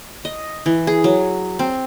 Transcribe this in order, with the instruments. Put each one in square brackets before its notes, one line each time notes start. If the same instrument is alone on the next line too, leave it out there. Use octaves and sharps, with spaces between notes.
[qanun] D#5
E3
G#4
F#3
C4